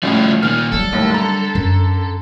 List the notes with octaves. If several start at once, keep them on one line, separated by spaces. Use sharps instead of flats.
C#2 A2 F3 G3 F#4
A#2 D#3 F6
F#3 G3 A4
D#2 A2 A#3
D3 A#5
F#2